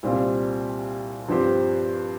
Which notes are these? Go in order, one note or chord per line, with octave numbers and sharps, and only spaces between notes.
C2 A#2 G3 C4 F4
G2 F3 C4 G4 C5